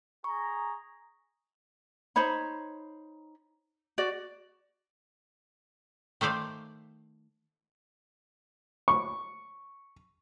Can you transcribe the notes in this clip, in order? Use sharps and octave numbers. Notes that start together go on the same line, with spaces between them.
G#4 A#5 C#6
D#4 C5 C#5 B5
F#4 D5
D#3 A3 C5 D5 F5
C#6